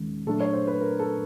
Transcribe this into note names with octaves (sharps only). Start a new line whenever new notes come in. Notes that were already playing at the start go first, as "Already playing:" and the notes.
Already playing: D#2 D#3 G#3 C#4
A#2 F#3 A3 D4 A4
C#5
C5
B4
A#4
A4